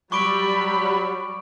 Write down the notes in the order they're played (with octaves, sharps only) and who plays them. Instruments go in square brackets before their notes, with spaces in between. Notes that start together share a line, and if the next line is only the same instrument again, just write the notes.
[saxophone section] F#3 [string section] G3 [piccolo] B5 [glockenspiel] C#6 D6 D7